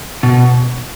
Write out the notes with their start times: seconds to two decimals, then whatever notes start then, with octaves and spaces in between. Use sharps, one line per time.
0.23 B2